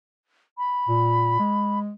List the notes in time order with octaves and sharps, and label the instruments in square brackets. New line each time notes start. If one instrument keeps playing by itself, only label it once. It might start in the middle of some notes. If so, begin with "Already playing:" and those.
[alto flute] B5
[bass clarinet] A#2
G#3